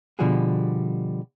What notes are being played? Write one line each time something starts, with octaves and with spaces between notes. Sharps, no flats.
B2 D3 F3 G3 F#4 G#4